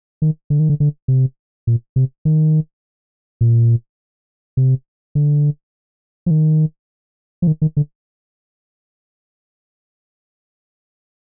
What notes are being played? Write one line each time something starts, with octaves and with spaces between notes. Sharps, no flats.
D#3
D3
D#3
D3
D3
C3
A#2
C3
D#3
A#2
C3
D3
F3
D#3
F3
D#3
D#3
D3